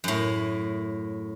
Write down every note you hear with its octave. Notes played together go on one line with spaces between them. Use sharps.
F#2 A2